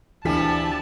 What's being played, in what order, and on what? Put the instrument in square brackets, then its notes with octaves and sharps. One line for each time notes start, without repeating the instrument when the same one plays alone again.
[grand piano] D2 B6 [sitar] C3 F3 G3 [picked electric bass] E3 [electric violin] A5 A6